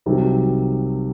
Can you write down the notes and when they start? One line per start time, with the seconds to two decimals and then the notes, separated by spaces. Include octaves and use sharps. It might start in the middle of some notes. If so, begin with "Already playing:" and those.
0.06 C2 C3 D#3 F#3